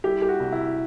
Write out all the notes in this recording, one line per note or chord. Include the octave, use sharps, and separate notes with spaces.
G3 E4 G4
G4
F#4
C2
E4